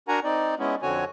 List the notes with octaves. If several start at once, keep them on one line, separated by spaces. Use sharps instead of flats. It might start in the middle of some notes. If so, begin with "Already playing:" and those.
D4 F#4 A#4 F#5 G#5 A#5
C4 D#4 D5
G#3 B3 C#4 E4
F2 D3 C4 F#4 C#5 G#5